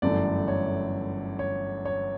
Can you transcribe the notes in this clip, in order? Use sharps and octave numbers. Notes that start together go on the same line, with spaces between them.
G1 F#2 E3 A3 D5
C#5
C#5
C#5